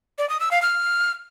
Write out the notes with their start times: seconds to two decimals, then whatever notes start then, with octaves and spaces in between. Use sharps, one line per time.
0.19 D5
0.29 D#6
0.40 E6
0.51 F5
0.62 F6